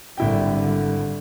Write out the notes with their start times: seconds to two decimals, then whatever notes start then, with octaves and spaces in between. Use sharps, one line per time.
0.17 G#1 D3 G3 E4 G5